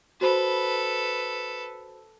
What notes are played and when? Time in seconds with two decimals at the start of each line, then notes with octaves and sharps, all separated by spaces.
0.21 F#4 A4 B4 C5 B5